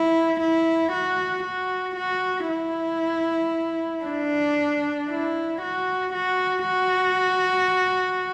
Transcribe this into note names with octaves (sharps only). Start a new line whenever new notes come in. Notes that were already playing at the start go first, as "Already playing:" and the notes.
Already playing: E4
E4
F#4
F#4
F#4
E4
D4
E4
F#4
F#4
F#4